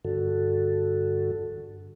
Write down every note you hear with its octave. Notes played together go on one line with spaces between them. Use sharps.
G2 D3 F#4 A4